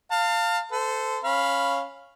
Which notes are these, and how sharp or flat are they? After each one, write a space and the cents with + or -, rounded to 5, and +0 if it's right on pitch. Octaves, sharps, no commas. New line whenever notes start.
F5 +0 A5 +35
A4 +0 C5 -25
C#4 -10 F5 +0 B5 +0